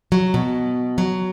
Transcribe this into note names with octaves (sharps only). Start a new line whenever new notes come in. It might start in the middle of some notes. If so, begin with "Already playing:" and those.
F#3
B2
F#3